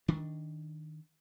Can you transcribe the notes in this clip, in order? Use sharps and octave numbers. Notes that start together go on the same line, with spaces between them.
D#3 D4